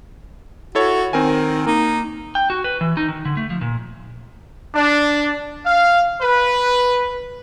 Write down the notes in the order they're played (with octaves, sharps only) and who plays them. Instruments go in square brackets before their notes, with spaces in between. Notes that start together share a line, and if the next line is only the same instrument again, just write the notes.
[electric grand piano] E4 A4 C#5 [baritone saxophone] F#4
[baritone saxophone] D#3 [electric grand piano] C4 A#4 G#5
[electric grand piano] A#3 [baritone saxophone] D#4
[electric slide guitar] G5
F#4
B4
E3
D#4
D#3
D3
A3
F3
A#2
[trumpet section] D4
F5
B4